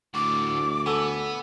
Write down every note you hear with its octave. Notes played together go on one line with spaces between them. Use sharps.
D2 A2 F#4 D6
B3 A4 G#5